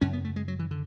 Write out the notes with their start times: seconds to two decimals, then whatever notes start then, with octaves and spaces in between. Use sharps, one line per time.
0.01 F#2 C#3 C#4
0.13 B3
0.25 A3
0.36 G#3
0.48 F#3
0.59 E3
0.71 D3